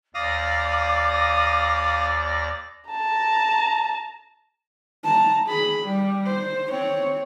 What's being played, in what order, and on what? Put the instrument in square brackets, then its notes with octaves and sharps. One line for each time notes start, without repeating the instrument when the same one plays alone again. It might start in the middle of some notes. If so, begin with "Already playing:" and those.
[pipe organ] D#2 D5 A#6 [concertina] F5 D#6 [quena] D6
[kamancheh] A5 A#5
[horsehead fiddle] A5 A#5
G#4 B5
G3
C5
C4 C#5